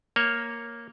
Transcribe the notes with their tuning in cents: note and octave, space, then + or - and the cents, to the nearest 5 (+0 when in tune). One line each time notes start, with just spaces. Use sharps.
A#3 +0 C#5 +0